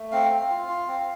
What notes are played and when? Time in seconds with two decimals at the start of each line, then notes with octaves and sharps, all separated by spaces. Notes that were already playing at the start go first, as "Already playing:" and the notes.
Already playing: A3
0.12 C4 F5
0.31 C4
0.49 F4
0.69 F4
0.88 C4